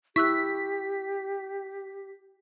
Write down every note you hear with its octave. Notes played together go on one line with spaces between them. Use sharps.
E4 G4 C#6 E6 F#6 B6